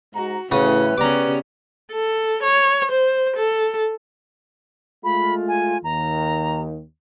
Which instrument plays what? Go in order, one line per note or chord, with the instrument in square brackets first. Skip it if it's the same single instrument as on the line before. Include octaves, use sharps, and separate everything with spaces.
[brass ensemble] G#2 A#5 [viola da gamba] F#4
[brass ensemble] A2 E3 [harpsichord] C#3 F#4 D#6 [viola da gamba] C#4 [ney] B4
[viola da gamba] C#3 B3 C#4 [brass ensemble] G4 D5 [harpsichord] A#5 D6
[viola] A4
C#5
C5
A4
[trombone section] G#3 A3 F4 [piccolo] B5
[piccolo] G#5
[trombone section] D#2 D#3 [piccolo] A#5